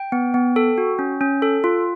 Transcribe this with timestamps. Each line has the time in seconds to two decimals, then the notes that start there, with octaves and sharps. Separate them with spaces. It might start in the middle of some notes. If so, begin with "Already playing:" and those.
Already playing: G5
0.12 B3
0.34 B3
0.56 A4
0.78 F#4
0.99 C#4
1.21 C#4
1.42 A4
1.64 F4